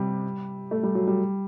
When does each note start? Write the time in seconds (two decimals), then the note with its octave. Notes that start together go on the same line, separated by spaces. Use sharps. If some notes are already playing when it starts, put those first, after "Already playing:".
Already playing: C3 G3
0.71 A3
0.83 G3
0.95 F#3
1.07 G3